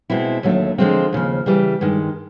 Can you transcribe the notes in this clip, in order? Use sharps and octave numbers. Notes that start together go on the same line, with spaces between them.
B2 G#3 C4 E4
D#2 D3 F#3 A3
D3 F3 G#3 C4 F4
D#2 C#3 F3
C#3 E3 G3
G2 D#3 G#3